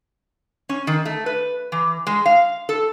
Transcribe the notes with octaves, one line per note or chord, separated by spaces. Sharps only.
C#4
D#3
A3
B4
E3
G#3
F5
A4